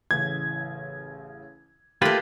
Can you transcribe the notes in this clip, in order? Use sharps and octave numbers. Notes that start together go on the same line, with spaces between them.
A1 C#3 E3 G#6
A3 A#3 F4 G4 B4